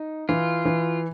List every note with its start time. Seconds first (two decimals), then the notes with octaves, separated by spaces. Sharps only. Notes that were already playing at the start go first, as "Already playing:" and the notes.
Already playing: D#4
0.29 E3 F4
0.65 E3